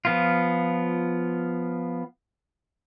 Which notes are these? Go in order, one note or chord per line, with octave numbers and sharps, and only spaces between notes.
F3 B3 F4